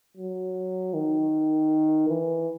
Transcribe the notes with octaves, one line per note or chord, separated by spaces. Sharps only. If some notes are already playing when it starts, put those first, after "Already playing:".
F#3
D#3
E3